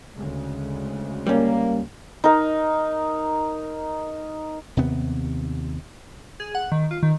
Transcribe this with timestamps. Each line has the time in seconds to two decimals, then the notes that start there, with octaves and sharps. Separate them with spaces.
0.17 D2 C#3 G#3
1.27 G3 A#3 C#4
2.24 D#4 A#4
4.77 D#2 C3 B3
6.40 G#4
6.55 F#5
6.72 D#3
6.91 F4
7.03 D#3